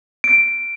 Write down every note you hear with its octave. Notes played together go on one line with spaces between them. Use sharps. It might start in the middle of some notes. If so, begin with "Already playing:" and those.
D7